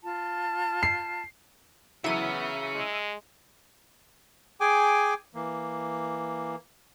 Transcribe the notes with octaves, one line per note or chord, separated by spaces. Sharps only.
F4 A5
C7
C#3 E3 F#3 B3 C#4 E4 E5 D#7
G#3
G#4 G5 G#5 D6
E3 A#3